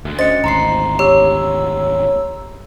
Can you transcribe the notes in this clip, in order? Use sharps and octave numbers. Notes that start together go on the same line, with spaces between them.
D2
C#4 C5 D#5 A6 C#7
G#1 D2 A#5 C6 C7
G4 C#5 E6